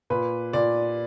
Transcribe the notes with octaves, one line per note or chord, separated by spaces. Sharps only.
A#2 B4
A#2 D5